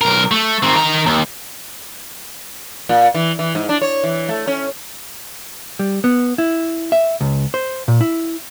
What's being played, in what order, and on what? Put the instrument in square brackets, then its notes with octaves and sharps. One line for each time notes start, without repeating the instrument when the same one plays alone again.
[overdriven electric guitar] B1 A#4
A3
D#3 C4
D#3 A#5
D#2
[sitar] A#2
E3
E3
G#2
D4
C#5
E3
A3
C#4
[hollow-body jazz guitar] G3
B3
E4
E5
C#2
C5
A#2
E4